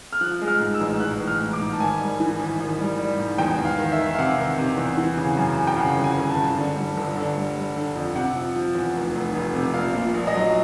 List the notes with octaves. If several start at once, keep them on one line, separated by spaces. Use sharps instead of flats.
F6
F3 F#6
G#3
F6
G#2
E6
A1
A1 F#6
A1
F6
G#2
D6
G#2
A5
G#1 G#5
G3
E3
G#1
G#1
G3
G3
G#2
E2 G5
E2
F5
D#3
E5
D#3
F5
C3 F#5
D#3
C3
E2
E3
C#3
F#2
F#2
G5
C#3 F#5
G1
G#5
G1
A5
G1
D3
G3
G1
D3
G3
G3
D3
F2
C3 F#5
F3
F3
E2
F1
F1
F1
C3
A#1 F5
A#2
A#1
D#5
F#3